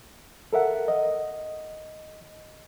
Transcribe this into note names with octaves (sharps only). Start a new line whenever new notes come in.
A4 A#4 E5 F#5
D#5